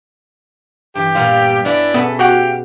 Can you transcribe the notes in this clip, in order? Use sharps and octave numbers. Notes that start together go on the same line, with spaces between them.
G2 E3 G4
A#2 G3 B3 F4 F5
B3 C#4 D4 E4 G5
B2 B3 C#4 E4 G#4 A4 B4
F#4 G4 F5 F#5